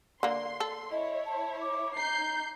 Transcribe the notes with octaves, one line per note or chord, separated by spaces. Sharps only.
D3 A#3 C6
A4
E4 C#5 D#5
A5
D6
D#4 A#5 G6 C7